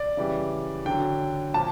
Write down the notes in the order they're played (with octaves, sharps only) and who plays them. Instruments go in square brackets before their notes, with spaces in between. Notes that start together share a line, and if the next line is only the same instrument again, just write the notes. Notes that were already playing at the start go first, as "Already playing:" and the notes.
Already playing: [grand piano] D5
C#3 E3 G3
D3 F#3 G5
A#2 F3 A5